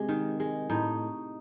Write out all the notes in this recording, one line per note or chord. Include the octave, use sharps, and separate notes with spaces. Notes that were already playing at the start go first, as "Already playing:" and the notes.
Already playing: C3 G#3
D#3
G#3
A2 D#4